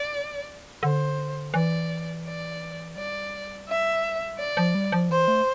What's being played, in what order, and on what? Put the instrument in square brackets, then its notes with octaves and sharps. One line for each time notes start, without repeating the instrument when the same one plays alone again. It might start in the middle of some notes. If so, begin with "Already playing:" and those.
Already playing: [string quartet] D5
[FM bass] D3 [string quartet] C5
[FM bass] E3 [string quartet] D5
[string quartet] D5
[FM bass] G3 [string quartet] D5
[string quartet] E5
D5
[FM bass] F3
G3
F3
[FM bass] E3 [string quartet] C5
[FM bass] A3